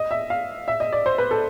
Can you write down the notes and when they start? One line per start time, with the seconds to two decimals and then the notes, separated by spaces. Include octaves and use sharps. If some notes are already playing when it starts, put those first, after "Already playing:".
Already playing: D#5
0.11 E5
0.30 F5
0.68 E5
0.80 D#5
0.93 D5
1.06 C5
1.18 B4
1.31 A4